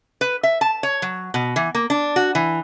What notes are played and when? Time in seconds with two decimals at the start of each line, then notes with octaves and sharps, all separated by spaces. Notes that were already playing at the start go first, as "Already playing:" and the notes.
0.21 B4
0.43 E5
0.61 A5
0.83 C#5
1.02 F#3
1.34 B2
1.56 E3
1.75 A#3
1.90 D4
2.16 F#4
2.35 E3